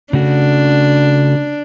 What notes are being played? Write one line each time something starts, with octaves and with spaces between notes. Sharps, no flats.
C#3 A3 D4 F#4